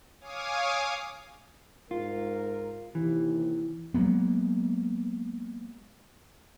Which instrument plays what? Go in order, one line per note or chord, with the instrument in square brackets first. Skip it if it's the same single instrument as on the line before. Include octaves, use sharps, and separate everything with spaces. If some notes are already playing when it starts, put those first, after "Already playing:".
[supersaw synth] C#5 F5 G#5 D6 D#6
[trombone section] G#2 A#4 [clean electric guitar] F4
[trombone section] D#2 C3 [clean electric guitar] E3
[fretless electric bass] F#3 G#3 A#3 B3